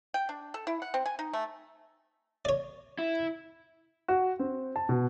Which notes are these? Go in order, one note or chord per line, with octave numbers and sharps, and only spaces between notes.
G5
D4
A4
E4
F#5
C4
G#5
D#4
A3
C#5 D5
E4
F#4
C4
A5
B2